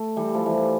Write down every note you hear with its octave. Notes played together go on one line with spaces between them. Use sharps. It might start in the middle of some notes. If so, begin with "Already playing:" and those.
Already playing: A3
E3 G3
F3 A3
E3 G3